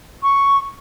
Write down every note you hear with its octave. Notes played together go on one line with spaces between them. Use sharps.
C#6